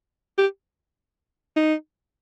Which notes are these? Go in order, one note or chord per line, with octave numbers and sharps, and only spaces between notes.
G4
D#4